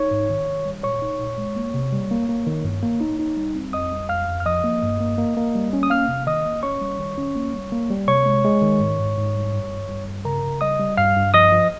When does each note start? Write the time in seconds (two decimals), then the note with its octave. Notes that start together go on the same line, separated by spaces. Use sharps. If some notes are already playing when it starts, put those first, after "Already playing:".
Already playing: D#4 C#5 C#6
0.11 G#2
0.30 D#3
0.48 D#3
0.65 G3
0.83 A#2 C#5 C#6
1.02 D#4
1.20 A#2
1.38 G#3
1.56 A#3
1.74 C3
1.93 G3
2.11 A#3
2.29 A#3
2.47 D#3
2.64 G2
2.83 A#3
3.01 D#4
3.19 D#4
3.37 G3
3.55 C4
3.73 F2 D#5 D#6
3.92 G3
4.09 F2 F5 F6
4.28 F2
4.40 F6
4.46 F3 D#5 D#6
4.64 A#3
4.83 G2
5.00 A#3
5.18 A#3
5.37 A#3
5.55 G3
5.73 C#4
5.83 D#6
5.90 A#3 F5 F6
6.08 C3
6.27 D#3 D#5 D#6
6.45 A#3
6.63 C#4 C#5 C#6
6.81 G3
6.99 D#3
7.18 C#4
7.35 A#3
7.54 G3
7.72 A#3
7.90 G3
8.08 C3 C#5 C#6
8.26 G#3
8.45 G#3
8.62 D#3
8.80 G#2
8.99 G#2
9.17 G#2
9.35 G3
9.53 G2
9.70 G2
9.88 G3
10.07 G2
10.25 C#3 A#4 A#5
10.43 C#3
10.61 G3 D#5 D#6
10.80 G3
10.97 G2 F5 F6
11.16 G2
11.34 F3 D#5 D#6
11.51 F3